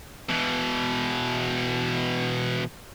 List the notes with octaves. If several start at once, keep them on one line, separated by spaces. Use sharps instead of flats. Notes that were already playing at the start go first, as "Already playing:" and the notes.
B2 E3